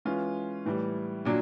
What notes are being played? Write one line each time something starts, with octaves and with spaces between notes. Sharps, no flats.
E3 G#3 C#4 F4
A2 E3 G3
A#2 F#3 D4